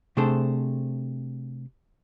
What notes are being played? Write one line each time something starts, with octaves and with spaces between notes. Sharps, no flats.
C3 A3 D4 G#4 A4 C5